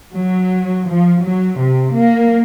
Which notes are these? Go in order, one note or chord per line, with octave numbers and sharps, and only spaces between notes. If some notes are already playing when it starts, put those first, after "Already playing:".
F#3
F3
F#3
C3
A#3